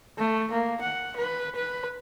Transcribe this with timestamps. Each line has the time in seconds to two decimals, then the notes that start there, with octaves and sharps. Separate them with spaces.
0.18 A3
0.52 A#3
0.82 F#5
1.17 B4
1.56 B4